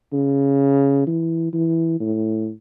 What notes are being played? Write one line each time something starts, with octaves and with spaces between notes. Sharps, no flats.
C#3
E3
E3
A2